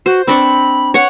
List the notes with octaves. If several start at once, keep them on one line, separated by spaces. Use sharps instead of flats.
F#4 C5
C4 D4 B5 C#6
C#5 F#5